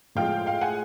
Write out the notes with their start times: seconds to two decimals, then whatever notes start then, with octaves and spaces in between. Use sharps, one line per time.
0.15 A2 F3 G#3 F5 G5
0.46 F5 G5
0.61 F#5 G#5